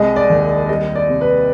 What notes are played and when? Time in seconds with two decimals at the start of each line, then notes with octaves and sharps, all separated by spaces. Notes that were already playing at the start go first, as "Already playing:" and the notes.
Already playing: C2 G#3 D#5
0.16 D5
0.30 D#2
0.69 G3 D#5
0.95 D5
1.08 C3
1.21 B4